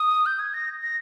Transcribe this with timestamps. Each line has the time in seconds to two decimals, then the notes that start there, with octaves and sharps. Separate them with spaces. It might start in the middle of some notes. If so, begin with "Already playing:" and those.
Already playing: D#6
0.26 G6
0.39 G#6
0.54 A#6
0.82 A#6